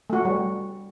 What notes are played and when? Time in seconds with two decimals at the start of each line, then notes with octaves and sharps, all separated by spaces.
0.10 A3 F#4
0.25 G3